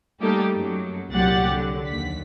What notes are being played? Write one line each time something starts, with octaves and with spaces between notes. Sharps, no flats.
G3 A3 A#3 D#4 G4 A4
F#2 F#3
C2 A#2 F#3 G4 F#5 A6
D3 F#3
D#2 B6